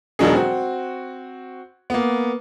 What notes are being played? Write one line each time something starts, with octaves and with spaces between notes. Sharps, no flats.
E1 B2 F#3 D4 D#4 G#4
C4 F#4
A#3 B3